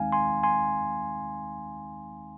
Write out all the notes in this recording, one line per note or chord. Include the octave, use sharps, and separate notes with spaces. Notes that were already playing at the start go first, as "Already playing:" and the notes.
Already playing: D#2 D#3 G#3 C4 D#4 F5 G#5
G#5 C6
G#5 C6